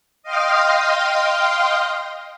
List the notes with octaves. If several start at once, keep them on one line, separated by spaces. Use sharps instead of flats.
D#5 F5 G5 C6 D#6 F6